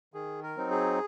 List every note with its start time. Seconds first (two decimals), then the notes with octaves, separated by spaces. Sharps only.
0.14 D#3 G#4
0.43 A#4
0.56 F#3 C4 D#4
0.71 G#4